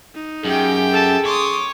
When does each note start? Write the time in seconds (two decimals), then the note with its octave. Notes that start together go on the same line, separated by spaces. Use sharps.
0.15 D#4
0.45 F#2 G4 G#4 G5
0.91 A4 A5
1.25 C#5 C6 D6 D#6